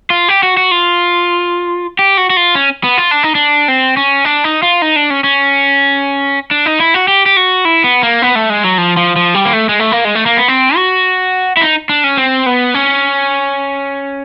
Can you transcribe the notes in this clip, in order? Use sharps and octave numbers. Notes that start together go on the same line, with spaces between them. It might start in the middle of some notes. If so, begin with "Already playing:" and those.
F4
G4
F#4
F#4
F4
G4
F#4
F#4
F4
C#4
B3
F4
D4
D#4
D4
C4
C#4
D4
D#4
F4
D#4
D4
C#4
C#4
D4
D#4
E4
F#4
G4
G4
F#4
E4
B3
A#3
B3
A3
G#3
F#3
F3
F3
F3
G3
A#3
A3
G#3
A3
A#3
G#3
A3
A#3
B3
C4
F#4
E4
D#4
D4
C#4
C4
B3
C#4